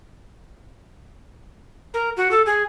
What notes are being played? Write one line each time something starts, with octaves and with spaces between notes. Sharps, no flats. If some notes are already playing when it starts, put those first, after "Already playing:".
A#4
F#4
A4
G#4